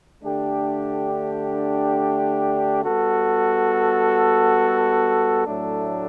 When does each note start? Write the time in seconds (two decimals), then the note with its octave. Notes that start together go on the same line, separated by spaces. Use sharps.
0.22 D3 A3 D4 G4
2.84 G3 B3 F#4 A4
5.46 A2 F#3 A3 D4 A4